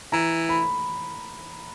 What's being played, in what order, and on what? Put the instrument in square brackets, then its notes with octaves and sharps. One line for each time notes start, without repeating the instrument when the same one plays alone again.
[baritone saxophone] E3 [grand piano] A#5
[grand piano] B5